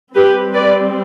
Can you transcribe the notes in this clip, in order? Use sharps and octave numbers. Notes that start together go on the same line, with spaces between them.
G3 C4 G4 B4
B4 D5